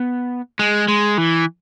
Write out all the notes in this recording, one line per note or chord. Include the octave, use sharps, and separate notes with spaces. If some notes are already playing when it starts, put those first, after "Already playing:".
Already playing: B3
G#3
G#3
E3